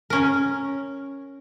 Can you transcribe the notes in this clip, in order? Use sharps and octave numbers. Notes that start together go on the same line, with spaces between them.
C#4 A#4